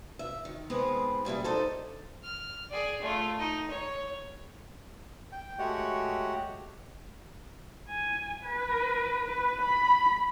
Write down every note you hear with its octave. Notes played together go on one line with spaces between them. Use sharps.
E5
D#3
D#3 G#3 B3 C4 G#4 B4
A#2 G3 E4 G#4
D4 D#4 A4 C5
F6
G#4 D5
A3 F4
D#4
C#5
G5
G#3 A3 F#4 G4 C#5 F#5
G#5
B4
B4
B5